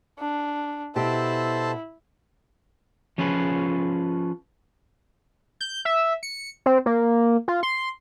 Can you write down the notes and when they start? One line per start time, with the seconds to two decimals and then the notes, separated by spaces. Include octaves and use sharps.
0.19 D4
0.96 B2 E4 G4 A4 C5 A5
3.18 F3 C#4 F4 G#4 B4
5.61 G6
5.85 E5
6.23 C#7
6.66 C4
6.86 A#3
7.48 F4
7.63 C6